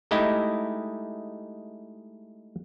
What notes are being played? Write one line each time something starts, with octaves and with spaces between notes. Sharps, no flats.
G#3 A3 D#4 E4 G4